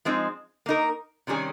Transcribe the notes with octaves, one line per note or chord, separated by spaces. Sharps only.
F3 G#3 C4 D#4
A#3 D#4 A#4
C3 D#3 G3 C#4 G#4